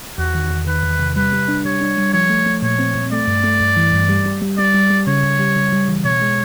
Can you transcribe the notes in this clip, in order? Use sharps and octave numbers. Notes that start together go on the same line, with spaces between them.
E2 F#4
D#3
E2
D#3 B4
E2
C3
G3 B4
G3
D4
G3 C#5
D4
G3
F3 C#5
A3
A3
A#2 C#5
C4
A#2
A3 D5
G2
A3
G2
E3
G2
G3
G3
G3
G3 D5
G3
G3
C#3 C#5
C#3
G3
C#3
G3
E3
B2 C#5
G#3